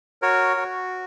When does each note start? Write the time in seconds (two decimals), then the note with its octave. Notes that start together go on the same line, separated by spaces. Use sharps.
0.22 F#4 A#4 C#5
0.57 F#4